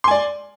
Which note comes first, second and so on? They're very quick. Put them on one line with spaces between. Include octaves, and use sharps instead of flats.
C6 G#5 D5